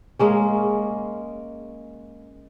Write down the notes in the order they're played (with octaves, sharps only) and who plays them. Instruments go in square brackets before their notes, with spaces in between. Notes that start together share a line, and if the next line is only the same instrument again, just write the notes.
[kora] G#3 A#3 C#4